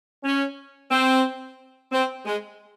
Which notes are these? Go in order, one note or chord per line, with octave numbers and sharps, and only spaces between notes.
C#4
C4
C4
G#3